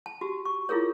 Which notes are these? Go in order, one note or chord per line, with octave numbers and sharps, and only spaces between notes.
A5
F#4 G4
C#6
E4 F4 G#4 A#4 C#5